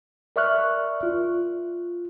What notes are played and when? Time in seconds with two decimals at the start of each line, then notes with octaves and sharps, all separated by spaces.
0.36 A#4 D5 E5 C#6 F6 F#6
1.03 F4